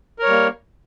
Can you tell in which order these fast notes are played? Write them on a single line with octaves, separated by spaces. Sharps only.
A#4 C#5 G3 A#3